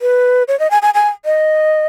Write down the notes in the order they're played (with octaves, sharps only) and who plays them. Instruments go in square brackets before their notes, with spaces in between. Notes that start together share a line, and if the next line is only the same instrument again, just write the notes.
[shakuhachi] B4
C#5
D#5
G#5
G#5
G#5
D#5